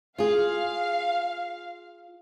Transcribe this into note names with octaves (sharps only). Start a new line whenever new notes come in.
F4 G#4 F5